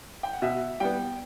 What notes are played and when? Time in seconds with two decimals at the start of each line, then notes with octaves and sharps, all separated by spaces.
0.23 G5
0.33 F#5
0.42 B2 E5
0.80 G3 B3 G5